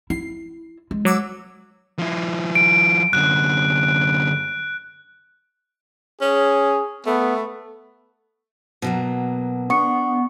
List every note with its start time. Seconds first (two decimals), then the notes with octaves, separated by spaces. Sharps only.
0.10 E4 C7
0.91 G#3
1.05 F#3 D6 E6
1.99 F3 E4
2.55 D7
3.13 F#2 D3 F#6
6.21 C#4 G#4
7.06 A3 B3
8.82 B2 F#3 A#3
9.70 B3 D4 C#6 C#7